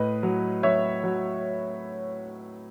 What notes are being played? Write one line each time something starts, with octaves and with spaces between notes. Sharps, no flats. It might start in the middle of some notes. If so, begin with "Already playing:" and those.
Already playing: A2 B4 D#5
F#3
F#3 C#5 E5
F#3